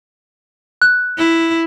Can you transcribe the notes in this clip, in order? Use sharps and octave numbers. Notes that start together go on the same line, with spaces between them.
F#6
E4